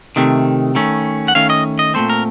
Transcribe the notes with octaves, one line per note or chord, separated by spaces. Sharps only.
C3 D#3 A3
D#3 A3 C#4
F#5
D#3 A3 C#4 F5
D#5
D#5
A#2 A3 C4 C5
A#4